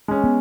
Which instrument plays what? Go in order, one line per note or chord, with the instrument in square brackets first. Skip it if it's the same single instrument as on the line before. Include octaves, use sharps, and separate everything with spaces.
[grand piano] G#3 C#4
[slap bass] B3